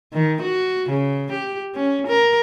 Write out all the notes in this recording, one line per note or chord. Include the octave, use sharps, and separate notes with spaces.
D#3
F#4
C#3
G4
C#4
A#4